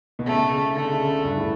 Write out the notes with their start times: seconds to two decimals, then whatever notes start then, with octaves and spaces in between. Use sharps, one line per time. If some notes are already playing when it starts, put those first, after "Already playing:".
0.19 B2
0.26 C#3 A3
0.51 C#3
0.75 D3 A3
1.00 C#3
1.24 G2
1.36 A2